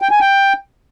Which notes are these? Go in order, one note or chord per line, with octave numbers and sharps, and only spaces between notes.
G5
G#5
G5